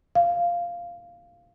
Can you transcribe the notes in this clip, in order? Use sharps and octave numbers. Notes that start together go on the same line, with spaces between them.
F5